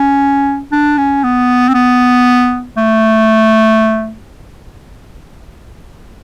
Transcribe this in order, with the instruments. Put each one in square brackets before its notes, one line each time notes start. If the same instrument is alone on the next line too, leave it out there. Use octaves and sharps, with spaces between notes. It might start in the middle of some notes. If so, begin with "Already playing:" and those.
Already playing: [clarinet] C#4
D4
C#4
B3
C4
B3
A3